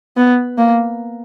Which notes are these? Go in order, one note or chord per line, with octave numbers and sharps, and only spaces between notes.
B3
A#3